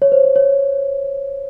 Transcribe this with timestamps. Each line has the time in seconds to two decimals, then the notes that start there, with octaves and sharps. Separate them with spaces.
0.02 C#5
0.12 C5
0.24 C5
0.36 C#5